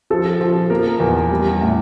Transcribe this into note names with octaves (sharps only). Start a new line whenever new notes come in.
F3 A4
F3
A#3 A#4
E2
G3
A2